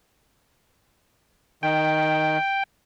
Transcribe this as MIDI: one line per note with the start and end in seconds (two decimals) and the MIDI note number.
1.63 2.38 51
1.63 2.63 79